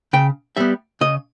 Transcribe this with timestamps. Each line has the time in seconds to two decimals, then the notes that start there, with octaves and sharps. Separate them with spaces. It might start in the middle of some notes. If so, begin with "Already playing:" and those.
0.13 C#3 G5
0.57 G3 B3 E5
1.01 C#3 D#5